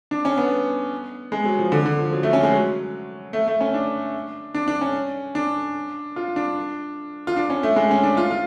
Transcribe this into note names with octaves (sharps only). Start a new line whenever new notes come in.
D4
C#4
B3
G#3
F#3
F3
D3
D3
F3
F#3
A3
C#4
G#3
F#3
A3
A3
C#4
D4
D4
D4
C#4
D4
F4
D4
F4
D4
C#4
A3
G#3
C#4
D4
F4
F4